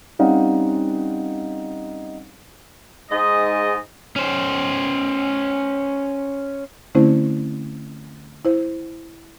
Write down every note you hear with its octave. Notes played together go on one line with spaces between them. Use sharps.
G3 C4 C#4 D#4 F5 F#5
G#2 D#5
C#4 C5
D3 A3 C4 C#4 E4 C5
E4 C5